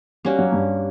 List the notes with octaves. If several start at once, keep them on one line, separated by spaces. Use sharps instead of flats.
G3 A#3 C#4 F#4
F#3
G2 G3